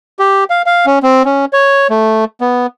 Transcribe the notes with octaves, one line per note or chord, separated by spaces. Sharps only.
G4
F5
F5
C#4
C4
C#4
C#5
A3
B3